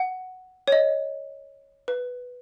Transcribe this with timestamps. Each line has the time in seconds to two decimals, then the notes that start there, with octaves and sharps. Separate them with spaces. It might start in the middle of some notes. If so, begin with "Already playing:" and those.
Already playing: F#5
0.68 C#5
0.72 D#5
1.88 B4